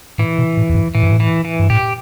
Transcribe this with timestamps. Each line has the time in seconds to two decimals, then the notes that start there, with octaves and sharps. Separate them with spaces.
0.18 A2 E3
0.38 B2
0.57 A2
0.69 E2
0.75 G2
0.95 A2 E3
1.03 G2
1.11 A2
1.20 E3
1.45 E3
1.59 G2
1.70 A2 G4